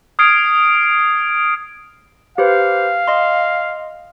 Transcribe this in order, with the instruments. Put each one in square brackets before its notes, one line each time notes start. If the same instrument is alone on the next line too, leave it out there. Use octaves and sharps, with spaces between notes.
[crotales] D#6 F6 G#6 C7 D7
[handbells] G4 B4 C5 [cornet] F5
[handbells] D#5 C6